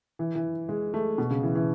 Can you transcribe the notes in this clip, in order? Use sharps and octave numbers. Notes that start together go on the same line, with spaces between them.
E3
E3
G#3
A3
B2
C#3
E3
E3